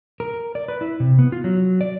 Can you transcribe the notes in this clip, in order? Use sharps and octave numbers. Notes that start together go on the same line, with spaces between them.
A#4
D5
B4
E4
C3
B3
F4
F#3
D5